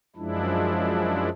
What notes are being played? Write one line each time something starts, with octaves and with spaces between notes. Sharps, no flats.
F#2 F3 G#3 D4 E4